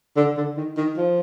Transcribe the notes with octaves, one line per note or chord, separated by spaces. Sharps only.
D3
D3
D#3
D#3
F3